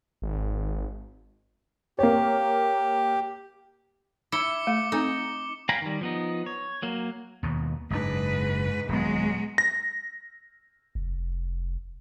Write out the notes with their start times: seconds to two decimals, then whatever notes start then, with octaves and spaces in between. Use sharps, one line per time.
0.22 G#1
1.99 A#3 G4 C#5
4.32 E4 D6 C#7 G7
4.67 A3
4.92 C4 D#4 A4
5.69 F5 G5 G#5 A#5 B5
5.82 D#3 G3
6.01 F3 B3 D#4
6.46 C#5
6.83 F#3 A#3
7.43 D#2 B2
7.90 F#1 G#2 D3 D4 B4
8.89 D#1 F#3 G#3 B3
9.58 A#6
10.95 F1